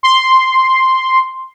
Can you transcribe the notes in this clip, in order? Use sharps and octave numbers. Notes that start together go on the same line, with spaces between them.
C6